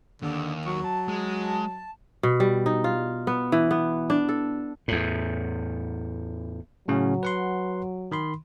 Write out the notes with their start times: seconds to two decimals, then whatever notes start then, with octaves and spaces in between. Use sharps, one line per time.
0.22 D#2 D3
0.66 F#3 C#6
0.84 A5
1.08 G#3
2.23 B2
2.40 G3
2.66 D#4
2.84 F4
3.27 B3
3.52 E3
3.71 B3
4.10 D4
4.29 A4
4.88 E2 A2
6.88 A2 C#3 F#3 C#4
7.23 B4 F#5 C6
8.12 D#3 B5 C6